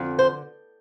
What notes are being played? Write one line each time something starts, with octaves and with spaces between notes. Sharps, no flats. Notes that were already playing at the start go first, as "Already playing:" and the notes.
Already playing: F2 D3
C5